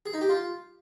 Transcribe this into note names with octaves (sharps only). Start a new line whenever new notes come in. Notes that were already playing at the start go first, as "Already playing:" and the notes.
G#4
D#4
G4
F4